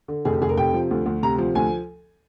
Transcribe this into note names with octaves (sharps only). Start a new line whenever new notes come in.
D3
F1 G#4
G4
F1 G#4
A#4
C3 G5
F3
D2
D2
C3 A#5
F3
D2 G#5